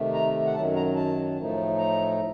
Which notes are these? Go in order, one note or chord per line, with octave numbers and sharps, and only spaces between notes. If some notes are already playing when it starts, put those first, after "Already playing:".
Already playing: C3 D#3 A3
A#5
F#5
F#2 D#3 F#3 A5
A#5
A5
A2 F3 A3 D#4
A#5